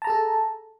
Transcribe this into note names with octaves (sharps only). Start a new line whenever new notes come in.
G#4 A4 A5 A#5